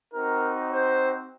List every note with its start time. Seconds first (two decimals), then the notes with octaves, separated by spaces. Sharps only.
0.12 C4 D#4 F#4 A#4
0.71 C5